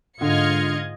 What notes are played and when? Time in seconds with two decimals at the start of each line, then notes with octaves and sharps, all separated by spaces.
0.21 G#2 D3 F4 D#5 F6 G#6 C#7